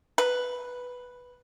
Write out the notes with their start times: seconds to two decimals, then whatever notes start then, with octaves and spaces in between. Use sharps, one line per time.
0.18 B4